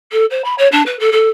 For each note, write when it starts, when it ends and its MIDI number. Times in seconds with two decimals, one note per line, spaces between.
0.11 0.25 69
0.30 0.42 72
0.44 0.54 83
0.58 0.67 73
0.71 0.82 62
0.86 0.99 71
0.99 1.09 69
1.12 1.29 69